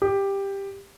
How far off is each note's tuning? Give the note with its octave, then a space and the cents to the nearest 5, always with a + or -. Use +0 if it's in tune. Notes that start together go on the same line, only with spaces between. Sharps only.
G4 +10